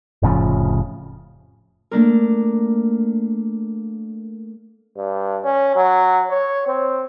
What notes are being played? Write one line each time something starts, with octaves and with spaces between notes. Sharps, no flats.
F1 A2 C#3 F3
A3 A#3 D4 A#4
G2
C#4
F#3
C#5
C4